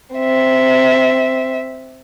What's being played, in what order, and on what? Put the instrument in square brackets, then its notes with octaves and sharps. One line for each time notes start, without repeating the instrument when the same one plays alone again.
[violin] C4 E5